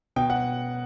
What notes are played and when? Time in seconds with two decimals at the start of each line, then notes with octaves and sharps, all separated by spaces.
0.16 B2 G5
0.30 F#5